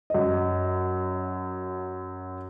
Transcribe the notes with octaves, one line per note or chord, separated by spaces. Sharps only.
F#2 D#5